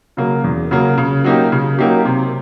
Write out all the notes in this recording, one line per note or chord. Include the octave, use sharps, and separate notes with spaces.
C#3 F#3 A#3
E2
C#3 F#3 A#3
C#3
F#3 A#3 D#4 G4
C#3
F#3 A#3 D#4 G4
C3